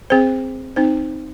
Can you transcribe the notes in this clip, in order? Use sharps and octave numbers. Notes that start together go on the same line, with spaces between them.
C4 G#4 C5
C4 D#4 C5